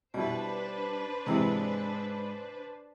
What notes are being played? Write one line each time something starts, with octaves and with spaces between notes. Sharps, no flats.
B2 G3 D4 E4 B4 C5
G#2 C3 E3 G#3 D#5